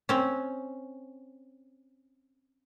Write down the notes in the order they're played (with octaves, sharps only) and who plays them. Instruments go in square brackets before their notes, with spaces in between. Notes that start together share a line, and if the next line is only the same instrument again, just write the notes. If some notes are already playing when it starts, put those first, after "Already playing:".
[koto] C4 C#4